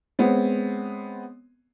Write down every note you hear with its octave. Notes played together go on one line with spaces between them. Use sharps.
G#3 B3 C4 C#5